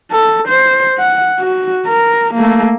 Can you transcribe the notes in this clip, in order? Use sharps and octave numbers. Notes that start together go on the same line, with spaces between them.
A4
C5
F#5
F#4
A#4
A3 A#3